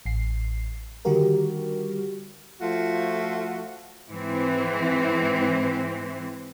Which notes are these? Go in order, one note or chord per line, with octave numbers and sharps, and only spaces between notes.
A1 C7
D3 D#3 G3 F#4 G4 A#4
F3 A3 F4 F#4
G#2 E3 C4